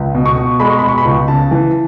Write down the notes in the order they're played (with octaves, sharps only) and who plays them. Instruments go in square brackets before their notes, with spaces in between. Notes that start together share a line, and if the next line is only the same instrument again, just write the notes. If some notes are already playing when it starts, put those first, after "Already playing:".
Already playing: [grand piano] C#2
B2
C#6
B2
G#3 B5
C#6
B2 B5
C#6
B5
C#2
C#3 A5
E3